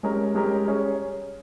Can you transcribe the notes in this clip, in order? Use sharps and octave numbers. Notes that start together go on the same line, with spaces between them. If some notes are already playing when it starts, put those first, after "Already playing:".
G#3 C#4 G4 A#4
G#3 C#4 G4 A#4
G3 C#4 G#4